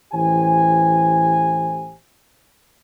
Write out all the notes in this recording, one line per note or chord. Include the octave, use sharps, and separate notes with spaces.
A1 E3 G4 C5 G#5